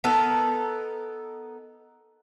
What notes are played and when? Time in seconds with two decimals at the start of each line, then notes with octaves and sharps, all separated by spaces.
0.04 B3 D#4 A4 A#4